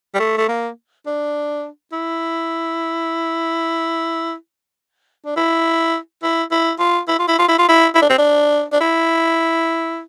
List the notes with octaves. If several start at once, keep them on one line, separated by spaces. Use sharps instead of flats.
G3
A3
A3
A#3
D4
E4
D4
E4
E4
E4
F4
E4
F4
E4
F4
E4
F4
E4
E4
D4
C4
D4
D4
E4